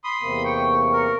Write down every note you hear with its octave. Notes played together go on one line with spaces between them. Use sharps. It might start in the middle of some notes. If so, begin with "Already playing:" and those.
B5 C6 D#6
E2 C3 A#3
G5 C#6
A#4